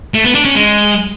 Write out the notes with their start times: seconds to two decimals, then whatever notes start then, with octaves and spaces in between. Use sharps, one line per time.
0.14 A3
0.24 B3
0.35 D4
0.45 C#4
0.55 G#3